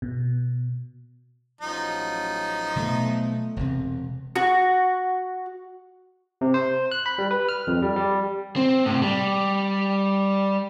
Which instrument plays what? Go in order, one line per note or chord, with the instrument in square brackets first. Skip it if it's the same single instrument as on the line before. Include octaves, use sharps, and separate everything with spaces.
[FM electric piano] B2
[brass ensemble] A1 F#3 [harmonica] F3 D#4
[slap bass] B2 F#3 B3 [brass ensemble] A3
[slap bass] E1 C3
[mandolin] F#4
[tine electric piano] C3
C5
F#6
B5
G3
B4
F6
F2
G3
G3
[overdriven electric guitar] C4
A2 C3
G3